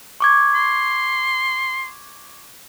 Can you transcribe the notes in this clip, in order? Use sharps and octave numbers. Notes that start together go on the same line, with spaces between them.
C#6 D6 G#6
C6